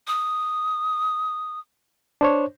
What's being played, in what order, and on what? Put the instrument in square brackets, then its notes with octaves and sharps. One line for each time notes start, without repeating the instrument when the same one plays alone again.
[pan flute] D#6
[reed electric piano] D4 C5 C#5